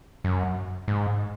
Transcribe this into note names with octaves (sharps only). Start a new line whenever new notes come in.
F#2
G#2